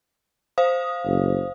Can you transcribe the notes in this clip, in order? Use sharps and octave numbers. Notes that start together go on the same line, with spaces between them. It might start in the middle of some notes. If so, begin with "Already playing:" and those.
C5 F5 D#6
F#1